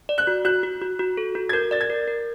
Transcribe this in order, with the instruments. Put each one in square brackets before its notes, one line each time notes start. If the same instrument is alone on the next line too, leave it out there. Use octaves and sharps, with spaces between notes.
[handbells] D5
[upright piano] F#6
[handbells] F#4
[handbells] F#4 [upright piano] F#6
[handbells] F#4
F#4
F#4
A4
F#4
[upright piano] G#6
[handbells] A#4 [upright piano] G6
[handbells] D5 [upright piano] A6
[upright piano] G#6
[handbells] A#4
A#4